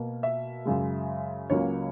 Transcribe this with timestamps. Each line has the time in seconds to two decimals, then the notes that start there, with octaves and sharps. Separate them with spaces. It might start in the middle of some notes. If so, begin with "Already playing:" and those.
Already playing: B2 A#3
0.23 E5
0.65 F#2 C#3 G#3
1.50 C#2 C#3 F#3 A#3 C#5